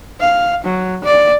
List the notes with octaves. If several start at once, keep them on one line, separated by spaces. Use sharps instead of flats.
F5
F#3
D5